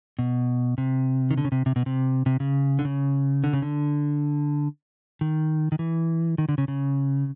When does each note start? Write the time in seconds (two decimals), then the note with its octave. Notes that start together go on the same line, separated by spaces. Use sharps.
0.19 B2
0.78 C3
1.31 D#3
1.38 D3
1.45 C#3
1.52 C3
1.66 C3
1.76 B2
1.86 C3
2.26 C3
2.40 C#3
2.79 D3
2.85 C#3
3.44 D3
3.53 C#3
3.62 D3
5.21 D#3
5.72 D#3
5.79 E3
6.38 D#3
6.49 D3
6.58 C#3
6.68 C#3